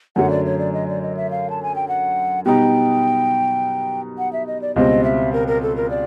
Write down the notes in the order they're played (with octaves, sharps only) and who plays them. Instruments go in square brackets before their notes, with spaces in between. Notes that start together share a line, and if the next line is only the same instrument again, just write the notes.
[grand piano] F#2 D3 F#3 A3 [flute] F#5
[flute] D5
C#5
D5
D#5
D5
D#5
E5
F5
A5
G#5
G5
F#5
[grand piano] B2 G3 B3 D#4 [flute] G5
[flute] F#5
E5
D#5
D5
[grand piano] C#2 B2 G3 C4 [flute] D#5
[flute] E5
A#4
A#4
A4
A#4
D5